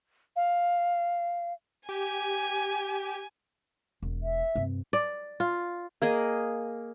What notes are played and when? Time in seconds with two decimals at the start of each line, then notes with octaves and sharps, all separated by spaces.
0.36 F5
1.89 G4 G#5
4.02 E1
4.22 E5
4.55 G2 C3
4.93 D5
5.40 F4
6.02 A#3 G#4 D#5